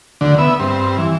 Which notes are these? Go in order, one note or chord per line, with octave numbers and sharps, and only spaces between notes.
D2 D3
B3 E5
G2 C4
E3